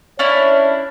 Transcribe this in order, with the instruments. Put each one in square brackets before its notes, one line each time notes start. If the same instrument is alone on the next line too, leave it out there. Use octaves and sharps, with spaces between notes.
[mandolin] C#4 D4 E4 [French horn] C#5